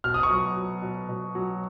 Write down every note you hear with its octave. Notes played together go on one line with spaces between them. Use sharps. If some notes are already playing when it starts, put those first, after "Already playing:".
B2 F6
D#6
C#6
F#3 D#6
F#3
B2
B2
F#3